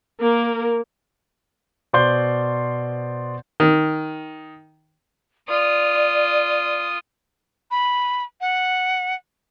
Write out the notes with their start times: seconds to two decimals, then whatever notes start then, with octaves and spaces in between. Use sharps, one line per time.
0.20 A#3 A#4
1.93 B2 C5 D5 C6 G6 G7
3.60 D#3
5.49 F4 D5 D#6
7.71 B5
8.41 F#5